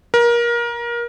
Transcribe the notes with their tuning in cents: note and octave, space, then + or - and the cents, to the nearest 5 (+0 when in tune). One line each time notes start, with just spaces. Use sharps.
A#4 +25